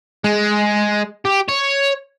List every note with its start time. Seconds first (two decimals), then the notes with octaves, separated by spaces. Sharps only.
0.24 G#3
1.25 G4
1.48 C#5